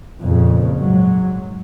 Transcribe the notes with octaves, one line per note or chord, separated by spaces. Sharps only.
F2 A#2 C#3
G#2 F#3